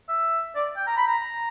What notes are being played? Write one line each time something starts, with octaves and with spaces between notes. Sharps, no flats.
E5
D5
G5
A#5
B5
A#5